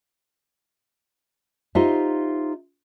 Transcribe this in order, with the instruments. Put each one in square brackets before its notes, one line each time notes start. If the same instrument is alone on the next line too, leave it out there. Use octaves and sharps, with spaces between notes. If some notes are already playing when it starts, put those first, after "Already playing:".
[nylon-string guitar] D#4 F4 G4 C5 D#5 E5